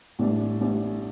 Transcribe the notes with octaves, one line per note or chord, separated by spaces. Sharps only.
A1 A2 G3 D4
A1 A2 G3 D4